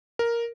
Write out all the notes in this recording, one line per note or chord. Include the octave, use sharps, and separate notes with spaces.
A#4